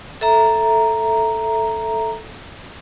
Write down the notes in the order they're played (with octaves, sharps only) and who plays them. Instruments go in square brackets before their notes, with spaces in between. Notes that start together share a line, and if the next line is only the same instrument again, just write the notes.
[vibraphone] A4 E5 A#5